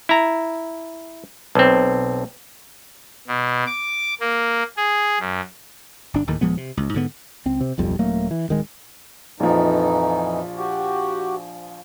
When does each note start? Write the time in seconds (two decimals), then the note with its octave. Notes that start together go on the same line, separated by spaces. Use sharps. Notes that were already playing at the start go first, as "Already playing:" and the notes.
0.09 E4 A#5
1.55 B1 C4
3.27 B2
3.67 D6
4.20 A#3
4.77 G#4
5.20 F#2
6.14 G1 D4
6.27 D1 D#2 A2 D#3
6.41 D#1 F3 G#3 B3
6.57 C3
6.77 C#2
6.94 G#2 D3 B3
7.45 C#2 C4
7.61 C3
7.78 D1 B1 F2 G3
7.99 D#1 F#3 A3 A#3
8.31 E3
8.49 D1 D#3 G#3
9.40 A#1 F2 E3 F3 D#4
10.57 F#4 G4